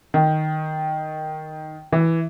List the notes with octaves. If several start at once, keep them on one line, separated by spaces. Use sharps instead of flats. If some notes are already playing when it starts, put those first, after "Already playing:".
D#3
E3